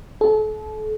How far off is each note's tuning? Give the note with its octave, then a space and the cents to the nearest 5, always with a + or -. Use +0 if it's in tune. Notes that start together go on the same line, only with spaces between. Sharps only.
A4 -35